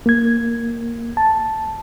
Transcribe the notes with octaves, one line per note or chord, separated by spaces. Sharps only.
A#3 G#6
A5